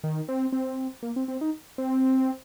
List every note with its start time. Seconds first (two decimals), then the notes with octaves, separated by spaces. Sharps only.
0.04 D#3
0.29 C4
0.52 C4
1.03 A#3
1.16 C4
1.28 C4
1.41 D#4
1.78 C4